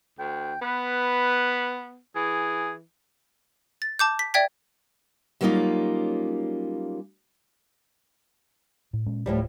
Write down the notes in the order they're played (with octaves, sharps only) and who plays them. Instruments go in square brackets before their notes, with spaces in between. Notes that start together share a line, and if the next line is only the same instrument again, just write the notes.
[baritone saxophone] D2 [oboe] G5
[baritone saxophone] B3 [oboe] B4
[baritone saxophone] E3 [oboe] G#4
[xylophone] A6
A5 D6 G6
B6
D5 E5 G5 G#6 B6
[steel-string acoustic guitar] F#3 G3 A#3 C#4 D#4 F4
[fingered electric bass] A2
A#2 G#3 C#4
[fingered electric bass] D1 [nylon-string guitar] A2 F3 G3